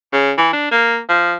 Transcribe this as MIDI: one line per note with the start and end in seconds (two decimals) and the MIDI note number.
0.13 0.32 49
0.38 0.48 52
0.53 0.70 62
0.71 0.99 58
1.09 1.35 53